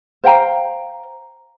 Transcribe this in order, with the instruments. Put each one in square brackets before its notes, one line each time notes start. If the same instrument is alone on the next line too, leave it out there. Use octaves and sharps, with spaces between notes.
[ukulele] C5 F5 G5 A#5